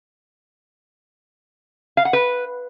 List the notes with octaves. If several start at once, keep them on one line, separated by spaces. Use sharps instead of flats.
F5
F#5
B4